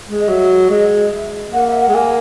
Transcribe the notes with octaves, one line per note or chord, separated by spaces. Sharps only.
G#3
D#5
F#3 E5
G#3 D#5
E5
A#3 F#5
E5
F#5
G#3
A#3 G#5